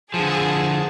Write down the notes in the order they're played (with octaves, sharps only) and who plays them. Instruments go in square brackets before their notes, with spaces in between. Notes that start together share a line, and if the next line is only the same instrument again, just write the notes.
[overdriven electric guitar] D3 F3 [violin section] G#4 A5